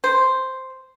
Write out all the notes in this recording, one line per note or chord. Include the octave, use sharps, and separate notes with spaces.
C5